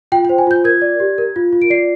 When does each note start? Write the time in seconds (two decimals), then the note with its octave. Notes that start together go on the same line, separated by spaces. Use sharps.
0.12 F4 G5
0.25 G5
0.29 C5
0.38 G#5
0.47 F4 G6
0.64 A#4 G#6
0.82 D5
1.00 G4
1.18 A#4
1.36 F4
1.53 F4
1.62 D7
1.70 D5 C7